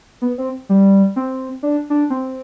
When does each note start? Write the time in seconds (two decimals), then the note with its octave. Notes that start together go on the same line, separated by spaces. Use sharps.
0.22 B3
0.38 C4
0.69 G3
1.16 C4
1.63 D4
1.90 D4
2.10 C4